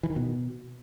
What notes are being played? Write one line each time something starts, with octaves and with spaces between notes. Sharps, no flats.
E3
D#3
B2